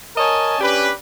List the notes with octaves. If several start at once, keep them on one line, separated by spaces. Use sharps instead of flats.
A#4 C#5 D#5 G#5 A5
C#4 D4 G4 B4